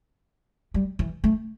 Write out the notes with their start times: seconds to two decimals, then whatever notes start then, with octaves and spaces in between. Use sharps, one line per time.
0.74 G3
0.99 E3
1.24 A3